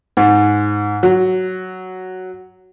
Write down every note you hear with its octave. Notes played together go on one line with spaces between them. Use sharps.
G#2
F#3